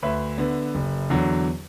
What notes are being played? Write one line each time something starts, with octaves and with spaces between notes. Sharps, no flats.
D2 B4 E5
D3 B3
F#1
E2 D3 F#3